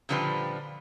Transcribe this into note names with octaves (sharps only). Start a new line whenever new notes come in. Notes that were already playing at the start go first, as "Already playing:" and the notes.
A#2 D3 F3 G3 B4